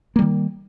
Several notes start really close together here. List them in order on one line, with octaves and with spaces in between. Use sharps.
A#3 G3 D#3